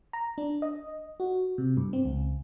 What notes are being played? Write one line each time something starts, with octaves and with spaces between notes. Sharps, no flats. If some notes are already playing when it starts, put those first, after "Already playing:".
A#5
D4
D#5
F#4
C3
G2
C4
C#2